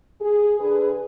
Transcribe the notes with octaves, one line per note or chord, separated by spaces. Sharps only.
G#4
D3 G#4 B4